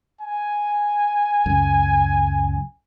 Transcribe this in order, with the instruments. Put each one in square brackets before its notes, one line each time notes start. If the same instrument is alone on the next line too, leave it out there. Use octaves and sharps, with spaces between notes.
[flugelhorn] G#5
[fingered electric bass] C#2 F#2